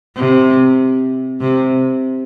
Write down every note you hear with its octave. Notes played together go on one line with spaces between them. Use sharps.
C3
C3